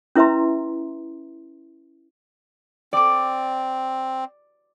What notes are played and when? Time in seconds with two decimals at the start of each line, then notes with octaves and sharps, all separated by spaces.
0.15 C#4 E4 B4 E5 A#5 C6
2.93 C4 D5 D6